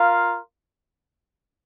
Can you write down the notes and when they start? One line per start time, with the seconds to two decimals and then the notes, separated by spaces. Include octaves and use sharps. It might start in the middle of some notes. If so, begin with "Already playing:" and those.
Already playing: F4 A#4 F5